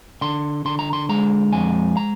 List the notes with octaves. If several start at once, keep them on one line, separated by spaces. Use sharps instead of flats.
D3 C6
D3 C6
A#5
C6
G#3 A#5
F2 G#5
A#5